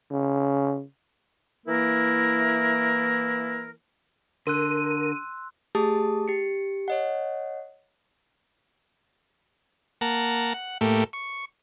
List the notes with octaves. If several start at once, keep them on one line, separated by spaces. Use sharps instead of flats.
C#3
E3 A#3 E4 A#4
D3 A#4 C6 E6 F#6 D#7
A3 G4 G#4 A5 D#6
G4 C#7
C#5 D#5 F#5
A#3 F#5 A5 A#5
F#5
A2 A3 A#3 G4
C#6